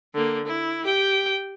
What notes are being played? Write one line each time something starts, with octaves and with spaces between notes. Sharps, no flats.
D3 A#3
E4
G4 G5